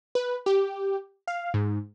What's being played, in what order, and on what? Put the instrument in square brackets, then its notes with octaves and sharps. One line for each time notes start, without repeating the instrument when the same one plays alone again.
[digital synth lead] B4
G4
F5
G#2